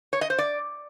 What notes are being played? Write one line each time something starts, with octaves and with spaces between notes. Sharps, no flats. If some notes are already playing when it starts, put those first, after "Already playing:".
C#5
D#5
C5
D5